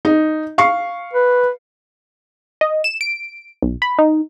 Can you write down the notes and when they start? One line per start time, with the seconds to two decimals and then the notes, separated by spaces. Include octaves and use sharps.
0.05 D#4
0.58 F5 C#6 C7
1.13 B4
2.61 D#5
2.84 E7
3.01 D7
3.62 B1
3.82 B5
3.99 D#4